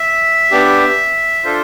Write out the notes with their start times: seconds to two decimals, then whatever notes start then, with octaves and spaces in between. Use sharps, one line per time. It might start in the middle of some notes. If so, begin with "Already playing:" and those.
Already playing: E5
0.51 B3 D4 G4
1.44 D4 F4 A4 C5